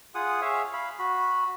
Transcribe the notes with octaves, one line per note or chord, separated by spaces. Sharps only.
F4 G#4 F#5 D#6
G#4 C#5 E5 F5
F5 B5
F#4 B5